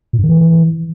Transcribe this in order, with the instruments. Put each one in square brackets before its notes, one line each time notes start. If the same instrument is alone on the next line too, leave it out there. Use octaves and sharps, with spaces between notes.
[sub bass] A#2
G2
D#3
E3